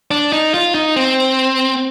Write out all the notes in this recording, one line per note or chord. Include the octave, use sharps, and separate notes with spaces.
D4
D#4
F4
D#4
C4